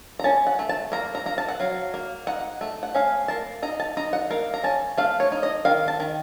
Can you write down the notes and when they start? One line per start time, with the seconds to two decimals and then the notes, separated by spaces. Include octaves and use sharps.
0.19 A#5
0.24 C#4 A5
0.47 F#5
0.59 A3
0.69 A5
0.92 A#3 A#5
1.15 A#5
1.26 A#3 A#5
1.38 A5
1.48 F#5
1.60 F#3 F5
1.94 A#3
2.27 D#4 F#5
2.61 A3
2.83 F#5
2.95 C#4 F5
3.28 A#3 A5
3.63 D#4 A#5
3.80 A5
3.97 D#4 A#5
4.13 F#5
4.30 A#3 F5
4.54 A#5
4.64 C#4 A5
4.97 A3 F5
5.20 C#5
5.32 D#4
5.43 D#5
5.65 D#3 F5
5.88 A5
6.00 D#3